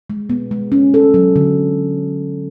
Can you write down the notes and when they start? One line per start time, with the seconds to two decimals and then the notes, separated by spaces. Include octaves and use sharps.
0.10 G#3
0.30 B3
0.51 G#3
0.72 C#4
0.94 A4
1.14 F#3
1.36 D3